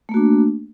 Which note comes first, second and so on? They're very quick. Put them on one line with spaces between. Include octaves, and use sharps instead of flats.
A3 A#3 F#4 D4